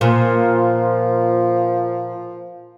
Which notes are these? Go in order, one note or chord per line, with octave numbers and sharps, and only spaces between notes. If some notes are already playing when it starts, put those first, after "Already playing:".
A#2 F3